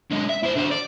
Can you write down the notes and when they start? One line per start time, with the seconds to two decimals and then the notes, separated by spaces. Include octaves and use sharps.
0.11 D3 G#3
0.29 E5
0.44 E4 C5
0.56 D3 C5
0.71 D5